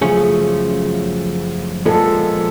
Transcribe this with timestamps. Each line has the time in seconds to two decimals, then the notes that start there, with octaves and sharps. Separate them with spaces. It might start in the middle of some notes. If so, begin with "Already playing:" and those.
0.01 F#2 C#3 F3 A3 C#4 G#4
1.86 A#2 F3 G#3 B3 A4